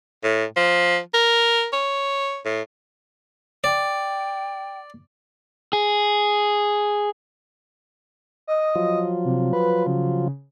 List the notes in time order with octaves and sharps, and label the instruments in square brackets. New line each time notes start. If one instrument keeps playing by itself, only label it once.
[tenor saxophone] A2
F3
A#4
C#5
A2
[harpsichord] D5 [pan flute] G5
[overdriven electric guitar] G#4
[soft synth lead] D#5
[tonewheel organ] F3 F#3 F4
[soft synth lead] C3
B4
C#3